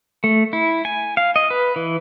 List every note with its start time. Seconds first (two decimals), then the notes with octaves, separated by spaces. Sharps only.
0.24 A3
0.53 E4
0.85 G#5
1.17 F5
1.36 D#5
1.50 B4
1.76 E3